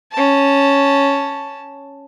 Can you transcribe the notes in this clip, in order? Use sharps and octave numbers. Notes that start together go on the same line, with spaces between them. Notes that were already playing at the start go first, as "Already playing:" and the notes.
C#4 A5